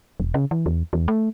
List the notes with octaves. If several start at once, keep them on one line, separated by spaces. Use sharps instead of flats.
E1
C#3
E3
E2
E2
A3